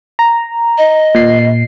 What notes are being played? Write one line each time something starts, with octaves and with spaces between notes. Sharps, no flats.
A#5
D#5
A#2 C7